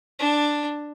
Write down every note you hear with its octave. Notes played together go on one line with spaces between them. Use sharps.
D4